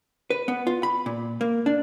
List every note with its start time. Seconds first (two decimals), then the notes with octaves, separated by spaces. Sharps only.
0.30 B4
0.48 B3
0.67 F4
0.83 B5
1.06 A#2
1.41 A#3
1.66 D4